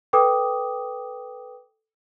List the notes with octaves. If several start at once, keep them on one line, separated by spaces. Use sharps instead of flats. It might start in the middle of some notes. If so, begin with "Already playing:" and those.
A4 B4 G5 D6 D#6